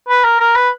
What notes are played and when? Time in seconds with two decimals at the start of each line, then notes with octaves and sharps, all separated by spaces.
0.09 B4
0.24 A#4
0.40 A#4
0.56 B4